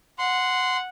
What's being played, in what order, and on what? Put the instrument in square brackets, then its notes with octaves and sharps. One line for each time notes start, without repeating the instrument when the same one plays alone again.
[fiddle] F#5 [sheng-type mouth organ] C6